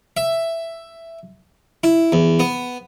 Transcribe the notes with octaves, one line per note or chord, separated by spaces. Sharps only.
E5
E4
E2
B3